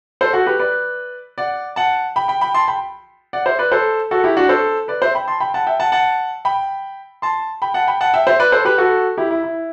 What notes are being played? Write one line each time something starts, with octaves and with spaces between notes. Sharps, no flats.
A4 C5
F#4 A4
G4 B4
B4 D5
D5 F#5
F#5 A5
G5 B5
G5 B5
G5 B5
A5 C6
G5 B5
D5 F#5
C5 E5
B4 D5
A4 C5
F#4 A4
E4 G4
D4 F#4
A4 C5
B4 D5
C5 E5
G5 B5
A5 C6
G5 B5
F#5 A5
E5 G5
F#5 A5
F#5 A5
G5 B5
A5 C6
G5 B5
F#5 A5
G5 B5
F#5 A5
E5 G5
C5 E5
B4 D5
A4 C5
G4 B4
F#4 A4
E4 G4
E4
E4